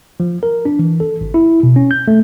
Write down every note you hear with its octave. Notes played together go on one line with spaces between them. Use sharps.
F3
A#4
D4
E3
A4
G#1
E4
B2
C#4
G6
A3